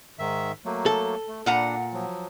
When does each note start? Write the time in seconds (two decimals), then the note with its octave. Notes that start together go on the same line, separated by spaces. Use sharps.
0.19 G#2 D#3 E5
0.65 F#3 A3 A#3
0.86 A4
1.28 A3
1.46 A#2 D4 F#5 A#5
1.93 F3 F#3